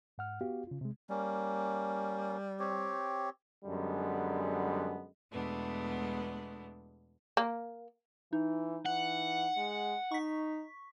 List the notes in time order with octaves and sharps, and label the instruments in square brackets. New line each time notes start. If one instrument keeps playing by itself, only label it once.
[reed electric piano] G#2 F#5 F6
B3 F#4 G4 F5
C#3 F4
C3 G#3
[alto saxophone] G3 [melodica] A#3 C#4
[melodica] C4 G4 C#5
[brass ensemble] F#2 D3 G3 G#3 B3
[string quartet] E2 B2 G#3 A3 B3 D4
[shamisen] A#3
[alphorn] E3 [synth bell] D#4
[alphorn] E3 [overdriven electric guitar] F#5
[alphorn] G#3
[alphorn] D#4 [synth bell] C#6 B6